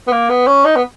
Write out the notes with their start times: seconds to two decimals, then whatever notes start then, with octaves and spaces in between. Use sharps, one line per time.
0.07 B3
0.12 A#3
0.30 B3
0.47 C#4
0.65 D#4
0.76 B3